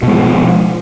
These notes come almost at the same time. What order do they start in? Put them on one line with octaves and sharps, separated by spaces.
B2 G#3 F3